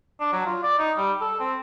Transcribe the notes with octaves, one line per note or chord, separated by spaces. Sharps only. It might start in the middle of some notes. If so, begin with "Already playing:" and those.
D4
F#3
F4
D5
D#4
G3
A4
C4